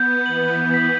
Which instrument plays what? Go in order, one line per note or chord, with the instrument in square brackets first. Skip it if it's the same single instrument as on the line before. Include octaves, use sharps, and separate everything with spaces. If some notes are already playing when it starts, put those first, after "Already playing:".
Already playing: [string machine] B3 [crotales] G6
[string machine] E3 [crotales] F#7
[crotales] B6